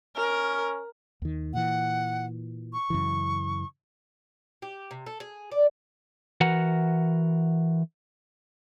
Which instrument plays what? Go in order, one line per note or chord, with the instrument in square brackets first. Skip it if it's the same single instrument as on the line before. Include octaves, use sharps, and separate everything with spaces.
[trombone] C#4 [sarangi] A#4
[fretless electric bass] D#2 D#3
[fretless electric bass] A#2 E3 [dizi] F#5
[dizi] C#6
[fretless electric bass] F#2 C#3 E3
[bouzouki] G4
C3
A4
G#4
D5
[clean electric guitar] E3 F#4 A#4 F#5